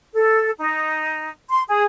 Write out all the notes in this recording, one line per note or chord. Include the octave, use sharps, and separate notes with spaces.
A4
D#4
C6
G#4